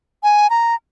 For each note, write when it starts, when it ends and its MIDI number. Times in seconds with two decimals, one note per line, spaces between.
0.23 0.50 80
0.50 0.75 82